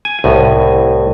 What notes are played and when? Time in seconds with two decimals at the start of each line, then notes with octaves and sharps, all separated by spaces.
0.05 G#5
0.24 C2 A2